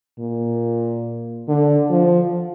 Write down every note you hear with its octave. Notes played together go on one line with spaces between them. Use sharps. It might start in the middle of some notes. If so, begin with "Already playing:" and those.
A#2
D3
F3